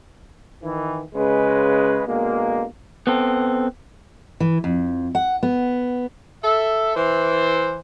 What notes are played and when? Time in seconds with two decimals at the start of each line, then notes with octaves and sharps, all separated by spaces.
0.64 D#3 E3
1.15 C#3 G#3 B4
2.07 B2 D3 G#3 A#3
3.07 B3 C4 A4
4.40 E3
4.64 F2
5.15 F#5
5.43 B3
6.44 A4 E5
6.96 E3 C5